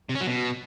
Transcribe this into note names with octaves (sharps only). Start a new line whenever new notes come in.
C3
C#4
F#3
B2